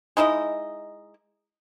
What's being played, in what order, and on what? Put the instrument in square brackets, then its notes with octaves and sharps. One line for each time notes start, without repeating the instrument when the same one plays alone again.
[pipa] G#3 D#4 E4 D#5